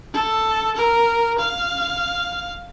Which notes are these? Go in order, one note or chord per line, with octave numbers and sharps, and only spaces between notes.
A4
A#4
F5